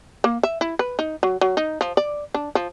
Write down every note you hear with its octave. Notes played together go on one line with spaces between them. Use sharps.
A#3
E5
E4
B4
D#4
F#3
F#3
D#4
F3
D5
D4
F3